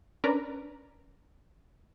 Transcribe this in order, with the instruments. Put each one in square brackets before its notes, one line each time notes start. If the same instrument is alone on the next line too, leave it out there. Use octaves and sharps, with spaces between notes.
[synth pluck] C#4 D4 A#4 B4 D5 A#5